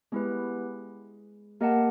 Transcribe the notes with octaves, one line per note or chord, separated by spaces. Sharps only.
G#3 B3 E4 G4 B4
A#3 G4 A#4 D#5 F#5 A5